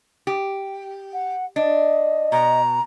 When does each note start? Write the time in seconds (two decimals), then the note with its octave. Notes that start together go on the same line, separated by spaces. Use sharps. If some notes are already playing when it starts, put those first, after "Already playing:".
0.27 G4
1.13 F#5
1.56 D4 D#5
2.32 B2 A#5